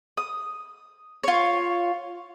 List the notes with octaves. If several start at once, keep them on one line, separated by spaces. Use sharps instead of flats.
D#6
F4 C#5